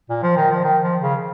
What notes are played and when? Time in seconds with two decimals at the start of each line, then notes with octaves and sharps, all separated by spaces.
0.09 A#2
0.23 F3
0.37 D#3
0.51 F3
0.64 D#3
0.83 F3
1.02 C#3